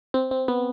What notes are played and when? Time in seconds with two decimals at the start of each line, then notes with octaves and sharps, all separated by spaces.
0.14 C4
0.31 C4
0.48 B3